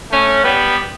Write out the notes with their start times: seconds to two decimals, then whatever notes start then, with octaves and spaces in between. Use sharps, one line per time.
0.11 A3 C#4
0.43 G3 B3